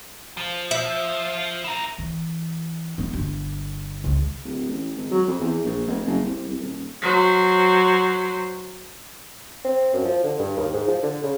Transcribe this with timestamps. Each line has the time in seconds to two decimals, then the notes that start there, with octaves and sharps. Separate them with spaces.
0.37 F3
0.71 E5
1.64 E4 A#4
1.98 E3
2.98 B3 E4
3.13 G1
4.04 C#2
4.45 D1
4.69 A1
4.97 G#1
5.11 F#3
5.28 F2
5.41 E2
5.65 A#1
5.87 F1
6.06 F#1
6.24 C2
6.48 C2
6.61 D#1
7.02 F#3 C5
9.65 C4
9.94 F#2
10.05 F3
10.24 D3
10.39 G2
10.57 D#2
10.74 G#2
10.88 F3
11.03 D3
11.23 C#3